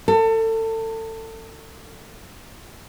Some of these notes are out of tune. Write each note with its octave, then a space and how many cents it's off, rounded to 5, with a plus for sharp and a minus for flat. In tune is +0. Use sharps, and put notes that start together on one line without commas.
A4 +30